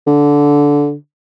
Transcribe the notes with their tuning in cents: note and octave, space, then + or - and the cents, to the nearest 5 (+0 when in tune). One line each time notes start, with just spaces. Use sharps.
D3 -15